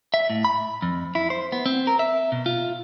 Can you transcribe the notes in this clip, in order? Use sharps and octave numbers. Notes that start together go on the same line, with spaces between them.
E5
A2
B5
F2
E4
C5
B3
C4
A#4
E5
B2
F4